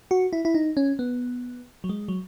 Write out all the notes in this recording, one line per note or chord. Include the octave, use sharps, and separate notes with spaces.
F#4
E4
E4
D#4
C#4
B3
F#3
G#3
F#3